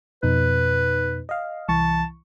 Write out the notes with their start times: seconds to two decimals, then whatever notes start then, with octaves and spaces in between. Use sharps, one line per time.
0.23 F2 B2 D#4 B4
1.29 D#5 F5
1.69 C2 E3 A5 C#6